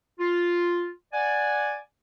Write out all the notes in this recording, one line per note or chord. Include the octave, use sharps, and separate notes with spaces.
F4
D5 F#5 G#5